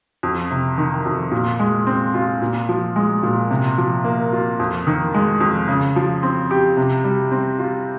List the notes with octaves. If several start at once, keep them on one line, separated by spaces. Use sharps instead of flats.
F2
C3
D#3
F2
A#2
G#3
C4
F4
A#2
F3
G#3
A#2
C3
F3
A#3
F4
F2
D#3
G#3
F2
C#3
F3
C4
G4
C3
G3
C4
F4